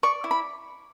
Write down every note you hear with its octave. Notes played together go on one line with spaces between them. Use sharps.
D5 C#6
E4
B5